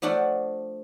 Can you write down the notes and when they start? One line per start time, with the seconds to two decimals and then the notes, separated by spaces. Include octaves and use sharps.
0.02 F3 A3 D4 A4 F#5